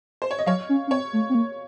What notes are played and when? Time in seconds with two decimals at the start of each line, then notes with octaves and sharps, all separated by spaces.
0.22 C5
0.31 C#5
0.39 D#5
0.46 F#3 C#5 F5
0.69 C#4
0.87 C#4
0.91 C4 C#5
1.13 A3
1.30 C4
1.35 A#3